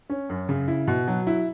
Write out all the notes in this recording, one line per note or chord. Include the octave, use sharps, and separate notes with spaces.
C#4
F#2
C#3
E4
B2
F#3
E4